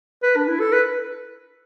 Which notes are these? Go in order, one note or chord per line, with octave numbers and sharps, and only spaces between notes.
B4
D4
E4
A4
B4